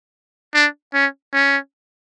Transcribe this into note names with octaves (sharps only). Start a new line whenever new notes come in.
D4
C#4
C#4